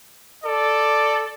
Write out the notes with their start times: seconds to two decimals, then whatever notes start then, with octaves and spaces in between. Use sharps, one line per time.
0.44 A4 D5